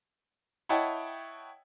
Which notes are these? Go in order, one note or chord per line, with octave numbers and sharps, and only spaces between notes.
E4 C#5 D#5 F#5 G5 A5